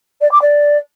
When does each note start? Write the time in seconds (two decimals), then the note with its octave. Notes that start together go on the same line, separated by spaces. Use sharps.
0.21 D5
0.31 D6
0.41 D5